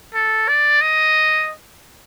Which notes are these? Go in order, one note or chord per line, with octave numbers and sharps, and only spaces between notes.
A4
D5
D#5